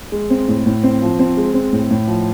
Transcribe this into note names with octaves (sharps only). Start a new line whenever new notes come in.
G#3
C4
A2
A2
C4
F3
C4
G#3
C4
A2
A2
F3